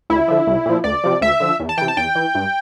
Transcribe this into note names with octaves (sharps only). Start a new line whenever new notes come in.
D2 E4
D3 F3
C2
A#2 F3
D2 D5
C3 F3
D2 E5
D3 F3
E2
A5
C3 E3 G5
A5
E2 G5
E3
G2